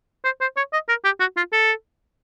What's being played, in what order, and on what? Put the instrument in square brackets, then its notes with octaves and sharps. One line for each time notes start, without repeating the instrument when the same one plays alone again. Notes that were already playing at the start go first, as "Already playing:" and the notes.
[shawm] C5
C5
C#5
D#5
A#4
G4
F#4
F4
A4